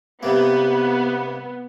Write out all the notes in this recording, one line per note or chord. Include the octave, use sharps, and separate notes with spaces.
G2 C3 A#3 B3